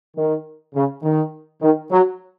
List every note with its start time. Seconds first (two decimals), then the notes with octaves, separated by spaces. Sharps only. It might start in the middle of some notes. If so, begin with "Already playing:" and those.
0.16 D#3
0.74 C#3
1.03 D#3
1.62 D#3
1.90 F#3